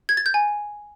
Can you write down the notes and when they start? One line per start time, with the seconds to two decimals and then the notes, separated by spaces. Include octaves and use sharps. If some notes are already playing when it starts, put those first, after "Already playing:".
0.09 G#6
0.17 A6
0.26 G6
0.34 G#5